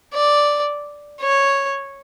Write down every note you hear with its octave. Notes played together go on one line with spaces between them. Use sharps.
D5
C#5